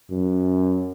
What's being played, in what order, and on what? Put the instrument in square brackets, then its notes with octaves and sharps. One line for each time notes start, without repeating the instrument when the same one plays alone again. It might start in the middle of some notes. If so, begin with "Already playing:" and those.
[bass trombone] F#2